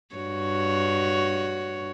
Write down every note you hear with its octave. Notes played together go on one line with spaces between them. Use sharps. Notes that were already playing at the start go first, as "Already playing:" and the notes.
G2 F#4 C#5